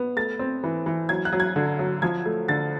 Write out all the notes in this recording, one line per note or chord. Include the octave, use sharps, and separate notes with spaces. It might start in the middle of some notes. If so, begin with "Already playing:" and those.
Already playing: B3
A3 A6
C4
E3
E3
F#3 G#6
F#6
F#3
G#6
D3
F#3
F3 G#6
A3
D3 A6